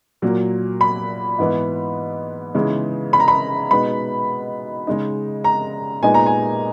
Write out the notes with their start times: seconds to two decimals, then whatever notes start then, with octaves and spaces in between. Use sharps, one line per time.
0.22 A#2 F#3 A#3
0.81 B5
1.38 G#2 E3 B3 D#4
2.54 C#3 E3 G#3 B3 D#4
3.13 B5
3.20 A#5
3.28 B5
3.71 B2 G#3 B3 D#4 B5
4.87 C#3 G#3 D#4
5.44 A#5
6.03 A#2 G#3 B3 D#4 G#5
6.14 A#5
6.26 G#5